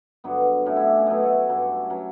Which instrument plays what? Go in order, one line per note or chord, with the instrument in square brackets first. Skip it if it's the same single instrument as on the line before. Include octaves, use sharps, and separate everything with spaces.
[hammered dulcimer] G2 D3 F#3 B3
A2 F#3 C#4
E4
D4
C#4
B2 F#3 A3
A3
G2 F#3
F#3 C#4